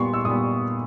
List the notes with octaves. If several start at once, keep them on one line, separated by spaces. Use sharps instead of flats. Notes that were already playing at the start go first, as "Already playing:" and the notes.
Already playing: A#2 G3 B3 C6 C#6
E6
A#2 G3 B3 D#6